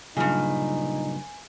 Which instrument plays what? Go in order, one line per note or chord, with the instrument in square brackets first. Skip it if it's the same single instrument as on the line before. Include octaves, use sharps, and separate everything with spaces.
[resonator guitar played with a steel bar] G2 A#2 [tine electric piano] C#3 F#3 G3 [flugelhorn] D#4 [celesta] G#5